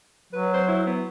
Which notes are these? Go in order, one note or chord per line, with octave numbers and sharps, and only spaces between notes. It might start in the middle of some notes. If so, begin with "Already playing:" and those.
F#3 B4
C5
E4
B3